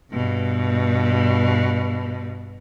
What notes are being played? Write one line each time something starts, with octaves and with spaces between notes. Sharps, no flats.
G2 B2